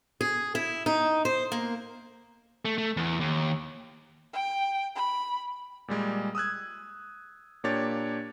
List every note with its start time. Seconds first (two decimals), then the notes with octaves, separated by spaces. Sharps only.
0.21 G#4
0.55 E4
0.86 D#4
1.25 C5
1.52 A#3
2.65 A3
2.78 A3
2.97 E2
3.20 D#2
4.33 G5
4.95 B5
5.88 A#2 G3 G#3
6.35 D#6 E6 F#6 G#6
7.64 A#2 A#3 D4 G4 C#5 A6